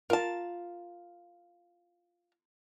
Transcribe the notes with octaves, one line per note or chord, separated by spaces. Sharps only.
F4 A#4 A5